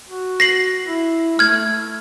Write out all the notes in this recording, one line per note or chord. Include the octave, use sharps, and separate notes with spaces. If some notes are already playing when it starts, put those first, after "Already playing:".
F#4
A#6 C7 F#7
E4
A3 F6 G#6